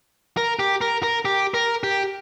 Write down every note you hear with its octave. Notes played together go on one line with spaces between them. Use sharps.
A#4
G4
A#4
A#4
G4
A#4
G4